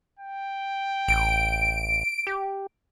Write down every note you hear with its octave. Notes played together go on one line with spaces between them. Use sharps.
G5
A1 D7
G4